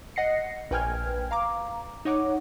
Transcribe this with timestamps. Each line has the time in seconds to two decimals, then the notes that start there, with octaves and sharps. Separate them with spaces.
0.16 D#5 F#5 A#6 C7 C#7
0.71 A#1 B4 G5 G#5 F6 G#6
1.31 F5 A#5 D6
2.05 D#4 C#5 F#5 D6